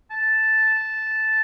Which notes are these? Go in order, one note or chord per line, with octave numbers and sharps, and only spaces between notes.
A5